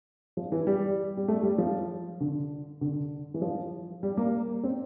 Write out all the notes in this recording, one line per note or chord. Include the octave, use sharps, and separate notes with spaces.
F3
E3
G3
G3
A3
G3
F3
D3
D3
E3
F3
G3
A#3
C4